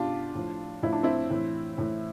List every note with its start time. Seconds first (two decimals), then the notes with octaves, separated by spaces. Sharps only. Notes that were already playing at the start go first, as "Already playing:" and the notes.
Already playing: B2 D4 F4 G4
0.35 A2 F3
0.83 A2 F3 E4
0.93 D4
1.03 C4 E4
1.30 A2 E3
1.78 A2 E3